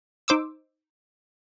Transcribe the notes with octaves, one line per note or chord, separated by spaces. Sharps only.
D#4 C5 D6 E6